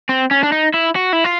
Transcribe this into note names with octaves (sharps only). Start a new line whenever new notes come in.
C4
C#4
D4
D#4
E4
F#4
E4
F4